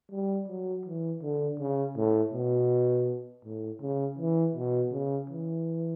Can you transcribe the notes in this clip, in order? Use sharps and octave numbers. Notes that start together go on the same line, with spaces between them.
G3
F#3
E3
D3
C#3
A2
B2
A2
C#3
E3
B2
C#3
E3